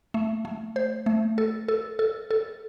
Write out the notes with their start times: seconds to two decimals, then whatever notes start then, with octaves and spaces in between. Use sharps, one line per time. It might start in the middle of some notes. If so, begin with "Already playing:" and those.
0.14 A3
0.45 A3
0.76 C5
1.06 A3
1.38 A4
1.68 A4
1.99 A4
2.31 A4